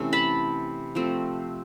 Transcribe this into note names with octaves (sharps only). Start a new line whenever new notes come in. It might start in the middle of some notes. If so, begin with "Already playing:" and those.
Already playing: C3 E3 A3 C#4
A5 B5
F3 A3 C4